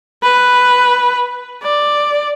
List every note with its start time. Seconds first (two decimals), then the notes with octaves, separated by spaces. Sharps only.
0.23 B4
1.63 D5